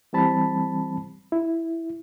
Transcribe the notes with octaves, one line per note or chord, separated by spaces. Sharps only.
E3 G3 C4 A5 B5
E4